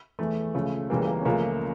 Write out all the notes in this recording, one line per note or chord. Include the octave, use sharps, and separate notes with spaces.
E2 E3 A3
C#2 C#3 F3 A3
C#2 C#3 E3 G3 A#3
A#3
C#4
C#2 C#3 F3 A3 A#3